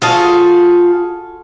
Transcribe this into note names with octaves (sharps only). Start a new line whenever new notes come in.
F4 F#4 G#4 A4 F5